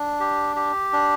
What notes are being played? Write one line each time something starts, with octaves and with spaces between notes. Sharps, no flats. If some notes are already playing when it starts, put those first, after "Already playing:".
Already playing: D4
G4
G4
D4